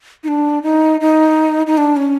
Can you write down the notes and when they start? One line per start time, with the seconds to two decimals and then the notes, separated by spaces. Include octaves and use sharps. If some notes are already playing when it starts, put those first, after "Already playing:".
0.24 D#4
0.28 D4
0.63 D#4
1.01 D#4
1.67 D#4
1.78 D4
1.97 C#4